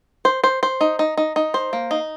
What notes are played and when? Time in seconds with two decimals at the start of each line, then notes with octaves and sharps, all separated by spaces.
0.25 C5
0.44 C5
0.63 C5
0.81 D#4
0.99 D#4
1.17 D#4
1.36 D#4
1.54 C5
1.73 A#3
1.91 D#4